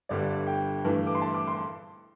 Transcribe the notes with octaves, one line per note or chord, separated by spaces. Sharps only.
G1 G2 D3 G3 D5
G5
G2 E3 A3
D6
C6
A5
D6
C6